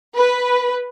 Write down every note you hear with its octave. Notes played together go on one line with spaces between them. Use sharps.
B4